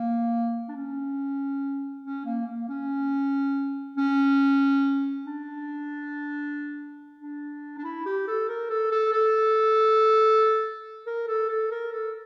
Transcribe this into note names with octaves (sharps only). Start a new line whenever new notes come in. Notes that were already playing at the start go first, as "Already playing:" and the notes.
Already playing: A#3
D4
C#4
C#4
A#3
A#3
C#4
C#4
D4
D4
D4
E4
G4
A4
A#4
A4
A4
A4
A#4
A4
A4
A#4
A4